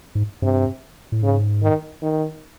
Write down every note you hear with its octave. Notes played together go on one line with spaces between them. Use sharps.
G#2
G2 C3
A2
G#2 C#3
D#3
D#3